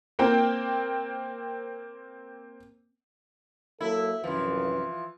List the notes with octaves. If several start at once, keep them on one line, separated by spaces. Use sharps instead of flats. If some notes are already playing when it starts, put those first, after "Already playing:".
A#3 C4 G5
F#3 A#3 E4 A4
C2 F#2 E3 F3 B4